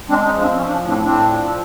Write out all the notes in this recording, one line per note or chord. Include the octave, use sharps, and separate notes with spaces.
G#3 C4 D4
C#4 D#4
F3
C4 D4
C4
F3 C#4
D4
C#4
A2
C4 D4
A2 C4 D4
F3